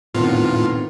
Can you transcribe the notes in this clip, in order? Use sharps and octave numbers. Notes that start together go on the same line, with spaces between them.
A2 D#3 B3 C4 F4